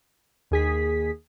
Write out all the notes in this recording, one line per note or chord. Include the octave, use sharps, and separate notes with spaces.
D#2 G#4 B6